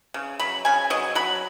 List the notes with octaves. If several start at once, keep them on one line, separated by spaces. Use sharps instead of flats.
C#3
F#3 B5
C#3 G#5
F#3 D#5
F#3 B5